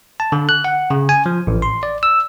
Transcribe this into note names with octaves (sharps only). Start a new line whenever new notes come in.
A5
D3
F#6
F#5
C#3
G#5
F3
A1
C6
D5
E6